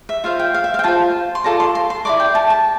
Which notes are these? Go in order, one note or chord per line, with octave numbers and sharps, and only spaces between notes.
E5
F4 C5 F5
G5
F5
E5
F5
G5
F4 C5 A5
C6
F4 A4 D5 A#5
C6
C6
C6
E4 A#4 D5 D6
G5
A5
A5